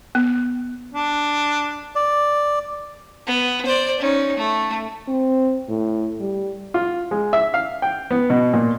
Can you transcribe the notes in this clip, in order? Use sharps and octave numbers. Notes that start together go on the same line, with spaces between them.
B3
D4
D5
B3
C5 D5
C#4 D#4
A3
C4
A2
G3
F4
G#3
E5
F5
G5
B3
B2
A#2